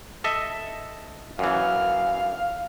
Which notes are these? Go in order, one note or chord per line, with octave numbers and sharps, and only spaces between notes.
A4 D#5 E5
F#2 E3 F5